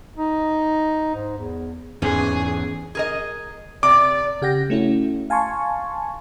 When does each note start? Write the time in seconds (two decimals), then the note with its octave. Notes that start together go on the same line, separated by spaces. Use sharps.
0.17 D#4
1.15 G#2
1.38 E2
2.02 E2 G#2 E3 C#4 G#4
2.95 G#4 A#4 D#5
3.83 C3 D5 D6
4.42 C#3 G4 F#5 G6 A#6
4.70 A3 C#4 E4 F#4
5.30 F5 G#5 A5 C6 C#6